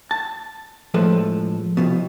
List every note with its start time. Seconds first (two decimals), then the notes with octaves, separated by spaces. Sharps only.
0.11 A5
0.94 A2 F3 G#3 A4 B4
1.77 C2 F2 B2